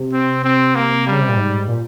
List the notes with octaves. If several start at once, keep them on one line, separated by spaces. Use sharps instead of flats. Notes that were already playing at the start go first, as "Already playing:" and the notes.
Already playing: C3
C4
C4
A#3
C#3 G3
C3
A#2
G#2
A#2